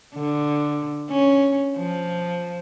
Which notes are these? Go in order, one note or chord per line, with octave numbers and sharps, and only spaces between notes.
D3
C#4
F3